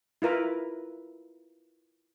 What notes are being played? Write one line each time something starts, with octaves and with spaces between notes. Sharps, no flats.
E4 F4 A#4 B4